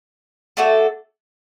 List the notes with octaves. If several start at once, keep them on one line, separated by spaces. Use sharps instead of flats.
A3 D4 F#4 A4